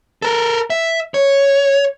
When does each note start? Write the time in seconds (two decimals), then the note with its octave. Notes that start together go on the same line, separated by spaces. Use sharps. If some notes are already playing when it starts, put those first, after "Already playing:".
0.22 A4 A#4
0.70 E5
1.14 C#5